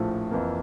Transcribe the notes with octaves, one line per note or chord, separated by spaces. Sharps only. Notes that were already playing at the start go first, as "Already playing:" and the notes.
Already playing: A#1 A2 F3 A3
F2 E3 A#3